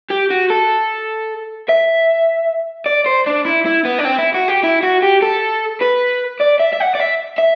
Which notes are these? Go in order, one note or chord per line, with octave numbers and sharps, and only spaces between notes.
G4
F#4
A4
E5
D5
C5
D4
E4
E4
B3
D4
C4
E4
F#4
G4
E4
F#4
G4
A4
B4
D5
E5
E5
F#5
D5
E5
E5